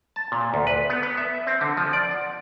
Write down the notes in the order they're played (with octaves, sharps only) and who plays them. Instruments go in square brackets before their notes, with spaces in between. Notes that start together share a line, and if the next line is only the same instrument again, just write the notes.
[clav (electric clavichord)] A5
A#2
D2
B4
B3
B3
E5
C4
D3
F3
D5
F#5